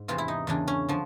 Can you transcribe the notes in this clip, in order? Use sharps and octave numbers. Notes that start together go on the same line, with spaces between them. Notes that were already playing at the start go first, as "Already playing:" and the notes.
Already playing: G#2
E2 C3 E3 F4
E4
D#4
E2 C#3 E3 D4
C#4
D3 F3